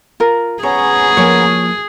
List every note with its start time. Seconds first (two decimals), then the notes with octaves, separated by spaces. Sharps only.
0.20 F4 A#4
0.63 B3 C#4 G#4 C#5 A#5
1.17 F3 A#3 C#5